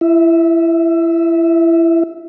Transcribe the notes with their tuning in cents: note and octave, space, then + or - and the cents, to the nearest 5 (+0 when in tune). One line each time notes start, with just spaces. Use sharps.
E4 +25 E5 -20